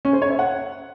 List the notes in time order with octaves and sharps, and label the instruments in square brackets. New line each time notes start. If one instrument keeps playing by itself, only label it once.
[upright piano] C#4
C5
C#5
E5
F#5